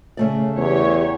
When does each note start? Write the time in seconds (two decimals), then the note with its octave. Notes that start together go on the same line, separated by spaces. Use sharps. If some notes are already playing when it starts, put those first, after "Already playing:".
0.17 C#3 A3 D5
0.58 E2 G4 C#5